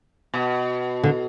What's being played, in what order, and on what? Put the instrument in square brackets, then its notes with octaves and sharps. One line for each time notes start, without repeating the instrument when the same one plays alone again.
[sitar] B2
[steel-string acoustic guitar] D3